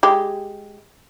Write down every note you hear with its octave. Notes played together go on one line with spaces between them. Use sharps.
G#3 G4